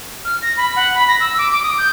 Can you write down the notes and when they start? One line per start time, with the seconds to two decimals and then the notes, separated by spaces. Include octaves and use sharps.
0.25 F6
0.42 A#6
0.57 B5
0.76 F#5
0.94 B5
1.08 A#6
1.20 E6
1.38 D6
1.51 D6
1.63 D#6
1.78 G6